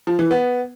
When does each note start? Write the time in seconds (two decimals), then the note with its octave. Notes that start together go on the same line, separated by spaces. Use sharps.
0.07 F3
0.19 E3
0.31 B3